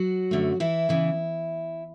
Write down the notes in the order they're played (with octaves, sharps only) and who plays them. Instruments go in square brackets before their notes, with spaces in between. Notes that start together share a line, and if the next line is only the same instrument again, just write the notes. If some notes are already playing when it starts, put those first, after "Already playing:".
Already playing: [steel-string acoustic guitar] F#3 F#4
F#2 D3 A3
E3 E4
C#3 E3 B3